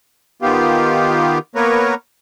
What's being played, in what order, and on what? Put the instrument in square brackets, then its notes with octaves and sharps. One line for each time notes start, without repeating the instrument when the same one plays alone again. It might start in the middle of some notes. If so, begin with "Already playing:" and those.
[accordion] D#3 B3 F4 G4
A#3 B3 A#4 B4 C#5